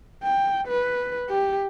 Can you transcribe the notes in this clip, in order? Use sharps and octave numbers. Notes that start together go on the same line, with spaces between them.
G5
B4
G4